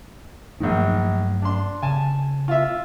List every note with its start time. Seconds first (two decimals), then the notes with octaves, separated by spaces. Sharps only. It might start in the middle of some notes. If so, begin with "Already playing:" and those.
0.60 A#1 G2 D#3 F#3 A3
1.42 D4 C6
1.82 C#3 G#5 A5
2.48 F4 E5